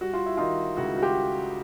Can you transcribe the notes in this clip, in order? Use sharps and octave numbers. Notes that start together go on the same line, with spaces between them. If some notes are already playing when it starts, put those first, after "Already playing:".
G3 F#4
F4
E4
D#3 D#4 F4
C#2 E4 F#4
F#4
F4 G4